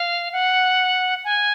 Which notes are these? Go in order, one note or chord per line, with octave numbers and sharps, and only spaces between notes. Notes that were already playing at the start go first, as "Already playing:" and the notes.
Already playing: F5
F#5
G#5